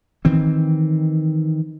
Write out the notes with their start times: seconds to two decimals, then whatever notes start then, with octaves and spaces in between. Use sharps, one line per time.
0.25 D#3 E3 C4